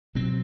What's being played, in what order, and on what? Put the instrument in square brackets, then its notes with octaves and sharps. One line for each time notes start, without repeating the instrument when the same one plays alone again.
[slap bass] B2 F#3 C4